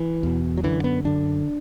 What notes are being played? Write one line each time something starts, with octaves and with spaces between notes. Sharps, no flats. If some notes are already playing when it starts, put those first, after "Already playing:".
Already playing: E3
E2 B2
F#3
F#2 D3 E3
B3
F#2 D3 D4